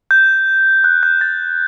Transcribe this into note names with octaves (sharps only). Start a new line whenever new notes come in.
G6
F#6
G6
A6